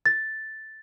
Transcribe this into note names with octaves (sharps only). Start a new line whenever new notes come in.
A6